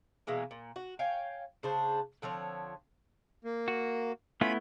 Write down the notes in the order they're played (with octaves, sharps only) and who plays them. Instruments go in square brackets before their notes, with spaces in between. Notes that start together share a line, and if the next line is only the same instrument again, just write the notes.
[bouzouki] B2 E3 G#3 A#3
A#2
F#4
C#5 F5 G5 G#5
C#3 D4 C5
D3 F3 C4 C#5
[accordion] A#3
[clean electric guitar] F#4
[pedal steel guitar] A3 B3 E4 [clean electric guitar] C#4 F4 [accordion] B5